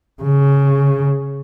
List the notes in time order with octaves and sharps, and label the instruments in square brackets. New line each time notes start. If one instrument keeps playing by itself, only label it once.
[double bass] C#3